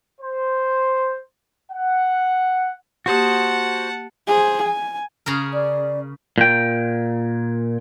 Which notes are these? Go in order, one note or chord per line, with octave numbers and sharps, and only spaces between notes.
C5
F#5
A#3 F#4 G4 C5 F#5 A5 C#6 D#6
G#4 C5
G#5
C#3 G#4 A#4
D5
A#2 G5